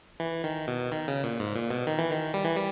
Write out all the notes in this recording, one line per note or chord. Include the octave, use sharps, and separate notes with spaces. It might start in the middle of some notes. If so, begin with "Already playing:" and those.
E3
D#3
B2
D#3
C#3
A#2
G#2
A#2
B2
D#3
E3
D#3
G3
E3
G3